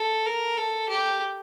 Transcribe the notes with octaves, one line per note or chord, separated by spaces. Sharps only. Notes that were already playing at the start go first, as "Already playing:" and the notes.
Already playing: A4
A#4
A4
G4